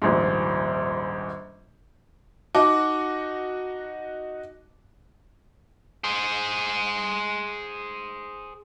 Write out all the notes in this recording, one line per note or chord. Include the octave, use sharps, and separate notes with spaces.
D#1 A#1 G#2
D#4 F#4 A5 D6
G#4 C5